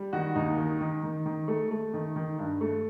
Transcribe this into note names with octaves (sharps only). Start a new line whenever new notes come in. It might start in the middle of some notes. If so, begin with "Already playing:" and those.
Already playing: G3
D#3 F#4
D#2 D#4
D#3
D#3
D#3
D#3
A3
A3
D#3
D#3
G2
A3